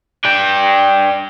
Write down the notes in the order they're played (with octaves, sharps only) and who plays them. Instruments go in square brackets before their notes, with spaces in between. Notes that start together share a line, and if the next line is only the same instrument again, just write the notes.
[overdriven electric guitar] D4 G5